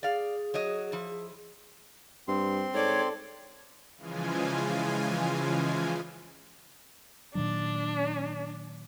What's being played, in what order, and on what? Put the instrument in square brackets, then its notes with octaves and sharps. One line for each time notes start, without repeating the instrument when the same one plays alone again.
[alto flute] G#4 [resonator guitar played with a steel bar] D5 F5
[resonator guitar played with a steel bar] F#3 C#5 D#5
F3 E4
[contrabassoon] G2 [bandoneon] C4 C6
[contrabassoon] G#2 [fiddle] A4 D5 [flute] C#5
[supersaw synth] C#3 E3 F3 G#3 F4 G#5
[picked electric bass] A#2 D#3 F#3 [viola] D4